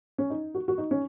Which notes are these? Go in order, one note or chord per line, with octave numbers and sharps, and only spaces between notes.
C#4
D#4
F#4
F#4
D#4
C#4